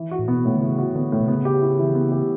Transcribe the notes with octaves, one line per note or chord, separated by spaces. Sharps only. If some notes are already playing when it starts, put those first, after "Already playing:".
Already playing: E3
F#4
A2
B2 B3
A2
D3
C#3 E3
F#4
D3 B3
A2
B2
C#3 B3
G4
E4
E3
B3
G4